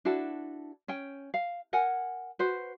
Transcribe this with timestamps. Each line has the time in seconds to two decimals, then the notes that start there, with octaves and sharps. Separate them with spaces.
0.05 D4 E4 F#4 A4
0.88 C#4 G5
1.34 F5
1.73 A#4 F#5 G#5
2.39 F#4 B4 C5